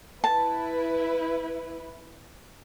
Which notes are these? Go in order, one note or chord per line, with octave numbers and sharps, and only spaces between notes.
E4 B4 A5